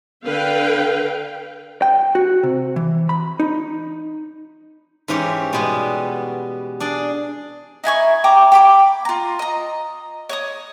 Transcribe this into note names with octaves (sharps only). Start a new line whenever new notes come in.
D3 B4 F5 G5
G5
F#4
C3
E3
B5
D#4
G#2 E3 C#4 G4 C#5 C6
B2 G3 G#3 B3
D4 G#4 D5
D#4 E4 G#5 C#6
G5 A#5 C#6 D6
G5 B5 D6
F4 A#5
D#5 A#5
C#5 D#5 D#6